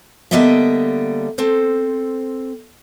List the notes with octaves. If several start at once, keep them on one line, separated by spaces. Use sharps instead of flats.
D3 G3 A#3 B3 D#5 E5
C4 A4 C5